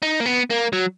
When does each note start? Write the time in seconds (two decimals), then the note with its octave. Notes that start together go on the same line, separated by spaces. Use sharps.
0.03 D#4
0.20 A#3
0.26 B3
0.50 A#3
0.73 F#3